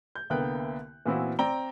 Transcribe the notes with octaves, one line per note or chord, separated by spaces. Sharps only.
G6
C2 D3 A#3 B3 G5 F#6
A#2 E3 B3 C4 E4 F#4
C4 D5 G5 A#5 G7